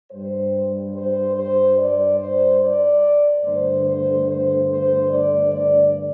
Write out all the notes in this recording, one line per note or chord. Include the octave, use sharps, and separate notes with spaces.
G2 G3 C5
C5
C5
D5
C5
D5
G2 D3 A3 C5
C5
C5
C5
D5
D5